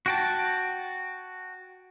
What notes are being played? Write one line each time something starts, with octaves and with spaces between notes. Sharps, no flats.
F#4 G5 A5